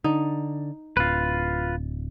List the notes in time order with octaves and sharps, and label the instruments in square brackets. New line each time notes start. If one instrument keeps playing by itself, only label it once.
[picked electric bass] D3 [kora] D#4
[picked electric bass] D1 [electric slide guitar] F4 B4